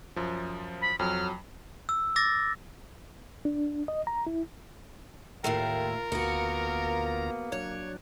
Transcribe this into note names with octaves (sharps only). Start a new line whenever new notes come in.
F#2 F3
B5
F2 F#3 F6
E6
D6 E6 A6 A#6
D4
D#5
A#5
E4
D#2 A2 A3 F4 A#4 G5
D2 A#3 B3 F4 F#4 A#5
F#3 D4 C#5